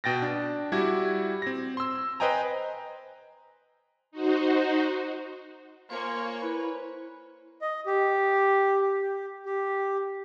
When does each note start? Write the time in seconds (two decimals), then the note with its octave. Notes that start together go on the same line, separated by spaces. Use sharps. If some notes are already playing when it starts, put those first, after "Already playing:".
0.04 B2 G5 A6 A#6
0.22 D4
0.72 G3 E4 F#4 D6 G#6
1.42 C4 A#6
1.77 C6 E6
2.20 B4 C5 D#5 G5 G#5 A#5
4.11 D#4 F#4 C5
5.90 A#3 F4 C5 C#5 G#5 C#6
6.42 E4 B4
7.62 D#5
7.86 G4
8.82 G4
9.46 G4